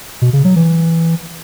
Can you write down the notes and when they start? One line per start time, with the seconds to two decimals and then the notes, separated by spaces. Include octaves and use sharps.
0.22 B2
0.33 C#3
0.45 F#3
0.56 E3